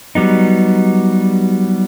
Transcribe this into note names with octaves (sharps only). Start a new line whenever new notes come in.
F#3 G3 B3 D#4